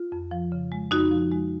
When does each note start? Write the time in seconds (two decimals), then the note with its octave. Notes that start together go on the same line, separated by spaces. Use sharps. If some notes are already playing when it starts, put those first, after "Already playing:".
Already playing: F4
0.12 F2
0.31 F3
0.52 C#3
0.72 G#3
0.91 F2 D#4 F#4
1.11 F3
1.31 G#3